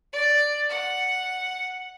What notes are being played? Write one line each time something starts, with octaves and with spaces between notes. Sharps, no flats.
D5
F#5